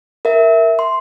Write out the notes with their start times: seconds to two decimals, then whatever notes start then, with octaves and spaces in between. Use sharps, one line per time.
0.25 A#4 E5
0.79 C6